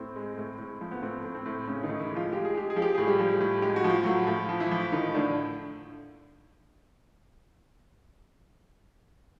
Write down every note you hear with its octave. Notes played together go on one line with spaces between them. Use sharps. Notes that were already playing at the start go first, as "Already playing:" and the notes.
Already playing: A2 C4
G#3
A2
A2
F3
B3
A2 C4
A2
C4
A2
A2 C#3 C#4
D#3 D#4
A2
E3 E4
G#3
F3 F4
G#3 G4
G#4
G#3 G4
G#4
F3
G4
A2 G#4
G3 G4
F3
A2
G#3 G4
F#4
F3
F4
A2 F#3 F#4
A2 F3 F4
F3
E3 E4
F3
A2 D#3 D#4
A2 D3 D4